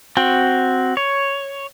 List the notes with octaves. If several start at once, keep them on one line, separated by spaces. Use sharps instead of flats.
C4 F#4 G5
C#5